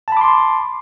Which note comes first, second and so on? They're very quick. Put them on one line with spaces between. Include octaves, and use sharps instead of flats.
A5 B5 D6 C6